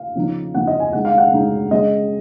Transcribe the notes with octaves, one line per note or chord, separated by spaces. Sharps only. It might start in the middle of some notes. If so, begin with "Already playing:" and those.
Already playing: F5
C#3 F3 B3 D#4
C#3 F3 B3 D#4 F#5
D#5
G#5
C#3 G#3 D#4 F#5
F5
F#5
C#3 G#3 D#4
C#3 G#3 C#4 D#5